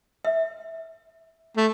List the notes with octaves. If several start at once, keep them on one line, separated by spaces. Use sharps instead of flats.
E5
A3